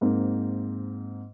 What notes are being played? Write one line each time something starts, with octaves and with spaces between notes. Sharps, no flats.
G#2 A#3 C4